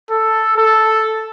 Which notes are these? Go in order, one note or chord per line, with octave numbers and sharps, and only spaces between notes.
A4
A4